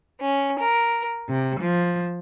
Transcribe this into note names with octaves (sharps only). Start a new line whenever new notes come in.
C#4
A#4
C3
F3